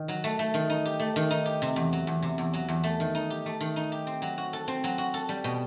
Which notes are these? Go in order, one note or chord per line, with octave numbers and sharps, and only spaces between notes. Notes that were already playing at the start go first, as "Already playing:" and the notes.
Already playing: D#3
F#3
A3
A3
D#3
D#4
G4
A3
D#3
D#4
G4
C3
E2
F#3
E2
C3
E2
F#3
E2
A3
D#3
D#4
G4
A3
D#3
D#4
G4
C4
F#3
F#4
A4
C4
F#3
F#4
A4
G3
B2